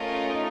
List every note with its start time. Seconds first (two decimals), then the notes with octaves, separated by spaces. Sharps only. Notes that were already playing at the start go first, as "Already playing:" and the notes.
Already playing: A3 C#4 F4 A#4 D#5
0.29 D#4